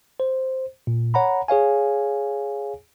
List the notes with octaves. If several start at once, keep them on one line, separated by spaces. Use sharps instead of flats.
C5
A#2
C#5 F#5 A#5 B5
G#4 C#5 F5 G#5